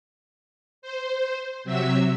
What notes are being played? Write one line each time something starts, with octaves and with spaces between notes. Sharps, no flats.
C5
C3 F#3 E5 E6